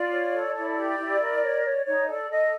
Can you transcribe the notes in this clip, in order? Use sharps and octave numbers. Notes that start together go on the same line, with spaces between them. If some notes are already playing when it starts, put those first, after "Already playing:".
Already playing: F4 D5
C#5
A4
E4 D5
G4
E4
A#4
C#5
C#5
D#4 C#5
A4 D5
A4 D#5